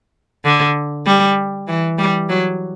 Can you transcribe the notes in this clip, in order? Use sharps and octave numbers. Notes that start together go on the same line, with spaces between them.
D3
G3
E3
G3
F#3